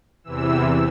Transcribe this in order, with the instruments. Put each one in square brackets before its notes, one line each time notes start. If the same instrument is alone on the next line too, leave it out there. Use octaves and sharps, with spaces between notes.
[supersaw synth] E2 C3 E3 E6